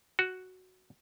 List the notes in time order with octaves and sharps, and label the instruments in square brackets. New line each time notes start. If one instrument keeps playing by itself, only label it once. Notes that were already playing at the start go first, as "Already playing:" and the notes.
[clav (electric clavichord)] F#4